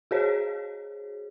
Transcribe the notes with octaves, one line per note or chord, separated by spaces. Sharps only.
F#4 G#4 C5 C#5